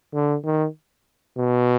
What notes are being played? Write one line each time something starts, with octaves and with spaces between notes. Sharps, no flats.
D3
D#3
B2